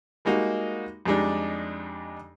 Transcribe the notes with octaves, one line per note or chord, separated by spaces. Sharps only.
G3 G#3 A#3 D#4 F#4
F2 G3 G#3 D4 D#4